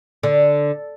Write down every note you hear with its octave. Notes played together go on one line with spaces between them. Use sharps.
D3